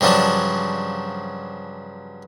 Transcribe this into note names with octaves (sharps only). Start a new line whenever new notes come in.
G2 C#3 F3 F#3 D4